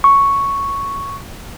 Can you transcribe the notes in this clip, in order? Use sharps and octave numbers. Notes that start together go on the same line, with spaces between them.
C#6